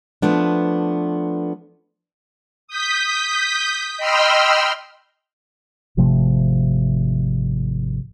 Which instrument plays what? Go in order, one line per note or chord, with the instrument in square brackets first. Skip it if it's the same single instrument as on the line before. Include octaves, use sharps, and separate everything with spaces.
[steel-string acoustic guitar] F3 A3 B3 D4
[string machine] D#6 G6 B6
D#5 G5 B5 C6 E6 F6
[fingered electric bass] G#1 C3 F3 A3